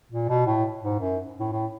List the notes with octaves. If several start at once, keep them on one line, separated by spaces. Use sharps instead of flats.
A#2
B2
A2
G#2
F#2
A2
A2